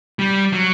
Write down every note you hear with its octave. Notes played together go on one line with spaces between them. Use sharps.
G3
F#3